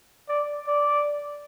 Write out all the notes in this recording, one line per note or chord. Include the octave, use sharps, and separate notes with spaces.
D5
D5